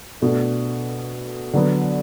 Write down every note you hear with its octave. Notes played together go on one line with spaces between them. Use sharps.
B2 A3 D4
D3 F#3 B3